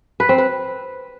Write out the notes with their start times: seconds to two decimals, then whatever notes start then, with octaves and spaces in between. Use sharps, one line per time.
0.20 B4
0.29 C4
0.38 B4